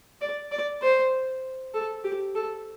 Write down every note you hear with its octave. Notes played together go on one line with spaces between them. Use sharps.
D5
D5
C5
A4
G4
A4